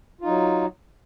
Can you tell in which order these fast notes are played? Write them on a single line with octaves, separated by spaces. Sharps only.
F4 D#4 F#3